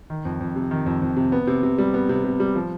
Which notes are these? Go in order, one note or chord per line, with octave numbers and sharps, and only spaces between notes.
D#3
F2
F2
C3
D#3
F2
F2
C3
B3
C3
C3
G3
B3
C3
C3
G3
F3